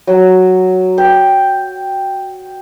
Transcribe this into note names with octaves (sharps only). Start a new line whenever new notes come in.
F#3
G5